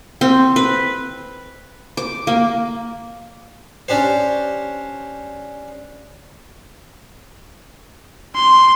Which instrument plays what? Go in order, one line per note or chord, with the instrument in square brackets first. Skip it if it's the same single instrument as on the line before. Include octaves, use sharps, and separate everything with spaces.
[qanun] C4
B4
D6
A#3
[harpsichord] C#4 D4 G4 C5
[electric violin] C6